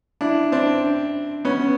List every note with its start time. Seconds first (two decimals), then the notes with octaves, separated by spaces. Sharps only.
0.21 D4 E4
0.52 C4 D4
1.45 B3 C#4